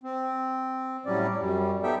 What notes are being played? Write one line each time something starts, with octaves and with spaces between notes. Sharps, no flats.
C4
A2 F#3 G3 C#4 D5
F#2 G3
B3 D#4 G4 A4 E5 G5